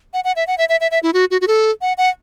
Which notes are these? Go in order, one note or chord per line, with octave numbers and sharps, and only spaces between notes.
F#5
F#5
E5
F#5
E5
E5
E5
E5
E4
F#4
F#4
F#4
A4
F#5
F#5